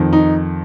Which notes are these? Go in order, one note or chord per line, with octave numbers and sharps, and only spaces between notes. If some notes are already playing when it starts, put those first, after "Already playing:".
Already playing: F2 D#3
D#4